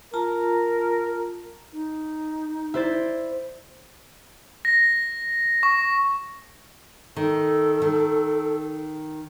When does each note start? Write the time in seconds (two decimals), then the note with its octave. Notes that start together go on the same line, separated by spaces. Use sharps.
0.14 F4 A#4 A5 A#5
1.72 D#4
2.74 E4 C5 D5
4.65 A#6
5.63 C#6
7.16 D#3 A4
7.82 D#3